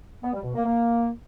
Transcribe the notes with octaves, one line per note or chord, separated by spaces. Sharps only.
B3
G3
B2
A#3
A#3